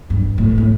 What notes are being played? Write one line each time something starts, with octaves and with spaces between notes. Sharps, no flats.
G2
A2
A2